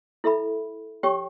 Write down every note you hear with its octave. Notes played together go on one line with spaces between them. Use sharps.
E4 A4 E5 B5
G4 C#5 G5 C#6